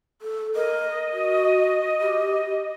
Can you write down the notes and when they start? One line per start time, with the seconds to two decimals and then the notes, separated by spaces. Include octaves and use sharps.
0.22 A4
0.55 A#4 D#5
1.13 F#4
2.01 G4